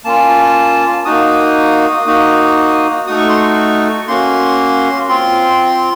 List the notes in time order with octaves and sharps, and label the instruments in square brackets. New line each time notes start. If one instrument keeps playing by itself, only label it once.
[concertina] A#3 C#4 F4 A5
A#3 D#4 F#4 D#6
A#3 D#4 F#4
A3 D#4 F#4 D#6
C#6
C6
C#6
A#3 C#4 F#4 C6
C4 F4 C6